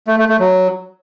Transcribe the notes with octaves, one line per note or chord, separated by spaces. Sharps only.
A3
A3
A3
F#3